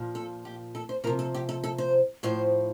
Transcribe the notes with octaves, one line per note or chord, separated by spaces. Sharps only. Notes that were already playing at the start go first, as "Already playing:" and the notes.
Already playing: A#2 F3
A4
G4
A4
C5
C3 F3 A#4
A4
G4
A4
A4
C5
A2 F3 C5